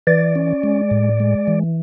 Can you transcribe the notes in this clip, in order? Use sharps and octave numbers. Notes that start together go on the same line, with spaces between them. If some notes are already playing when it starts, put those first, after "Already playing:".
E3 D5
C#4
G#3
A2
G#3
E3